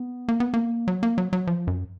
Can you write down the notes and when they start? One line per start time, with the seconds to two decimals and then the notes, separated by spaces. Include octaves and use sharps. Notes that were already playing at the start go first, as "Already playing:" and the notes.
Already playing: B3
0.28 A#3
0.40 B3
0.54 A#3
0.88 F#3
1.03 A#3
1.18 F#3
1.33 F#3
1.47 F3
1.67 F#2